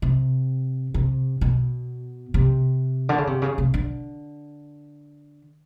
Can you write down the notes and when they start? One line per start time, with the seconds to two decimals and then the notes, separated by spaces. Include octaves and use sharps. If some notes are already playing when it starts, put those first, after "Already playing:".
0.02 C3
0.94 C3
1.41 B2
2.34 C3
3.09 D3
3.18 C#3
3.27 C3
3.42 C#3
3.58 C3
3.74 D3